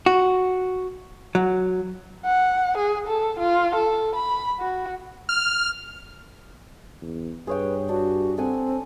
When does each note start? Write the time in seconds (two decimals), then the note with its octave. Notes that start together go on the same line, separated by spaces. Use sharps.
0.06 F#4
1.35 F#3
2.25 F#5
2.77 G#4
3.07 A4
3.39 F4
3.75 A4
4.15 B5
4.60 F#4
5.29 F6
7.01 E2
7.47 G2 G#4 B4 C#5 G5
7.89 D4 F#4
8.38 C4 A4 F#5 G#5